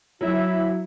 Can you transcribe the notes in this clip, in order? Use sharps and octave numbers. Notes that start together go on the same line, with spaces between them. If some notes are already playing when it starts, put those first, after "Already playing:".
F#3 E4